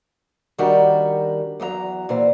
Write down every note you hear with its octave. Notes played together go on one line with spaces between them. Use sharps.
D#3 G3 D4 F#4 G4 A#4
E2 F#3 D#5 A#5
A#2 E3 C5